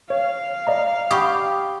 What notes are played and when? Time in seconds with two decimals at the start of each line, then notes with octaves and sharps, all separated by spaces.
0.10 C#5 F5
0.67 D5 D#5 A#5
1.11 G4 B5 C#6 D#6